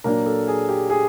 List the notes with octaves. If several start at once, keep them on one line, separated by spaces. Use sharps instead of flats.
A#2 F#3 A#3 D4 A#4
A4
G#4
G4
G#4